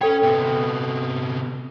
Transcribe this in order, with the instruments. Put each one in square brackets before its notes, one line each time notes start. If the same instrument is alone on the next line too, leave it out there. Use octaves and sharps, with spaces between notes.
[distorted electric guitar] C#4 C#5 [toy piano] A4 G5
[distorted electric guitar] C3 B3